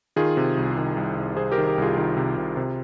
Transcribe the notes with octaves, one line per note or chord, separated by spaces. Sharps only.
D#3 F4 G#4
C3
C2
D#3
C2
C2
C2 G#4 C5
G4 A#4
D#3
G4
C2 F4 G#4
D#3 F4 G#4
C3
C3
C3